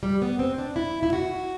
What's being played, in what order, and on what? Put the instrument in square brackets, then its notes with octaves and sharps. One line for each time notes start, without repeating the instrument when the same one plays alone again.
[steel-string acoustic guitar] G3
B3
C4
D4
E4
E4
F#4